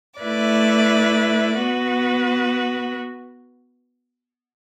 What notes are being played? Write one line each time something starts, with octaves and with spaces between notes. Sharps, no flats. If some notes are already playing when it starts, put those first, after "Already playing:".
A3 E4 B4 D5
B3 F#4 B4